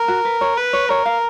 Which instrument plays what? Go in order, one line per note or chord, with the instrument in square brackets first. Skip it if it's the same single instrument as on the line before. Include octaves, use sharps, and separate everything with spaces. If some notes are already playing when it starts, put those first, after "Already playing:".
Already playing: [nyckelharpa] A#4
[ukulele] F#4
B4
C#5
[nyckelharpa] B4
[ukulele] C#5
[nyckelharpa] A#4 [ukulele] C#5
[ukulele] F5